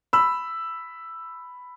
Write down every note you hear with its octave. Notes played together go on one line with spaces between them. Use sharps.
B5 E6